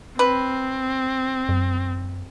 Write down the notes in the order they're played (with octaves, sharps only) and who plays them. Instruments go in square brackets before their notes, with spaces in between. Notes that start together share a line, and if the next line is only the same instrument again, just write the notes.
[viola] C4 [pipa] B4
[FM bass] F#2